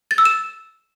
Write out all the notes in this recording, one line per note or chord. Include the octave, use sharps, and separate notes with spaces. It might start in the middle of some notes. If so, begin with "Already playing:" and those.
A6
E6
E7